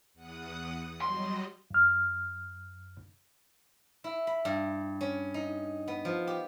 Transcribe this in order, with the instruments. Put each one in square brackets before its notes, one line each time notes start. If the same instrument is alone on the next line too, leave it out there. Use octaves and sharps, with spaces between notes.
[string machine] E2 F#5 D#6
[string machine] F#3 G3 D#5 [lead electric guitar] C6
[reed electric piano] F#2 F6
[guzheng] E4
B5
G2
C#4
D#4
B3
F3
G4